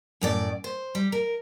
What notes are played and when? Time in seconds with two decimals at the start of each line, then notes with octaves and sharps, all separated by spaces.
0.21 F#2 A2 D5
0.64 C5
0.95 G3
1.12 A#4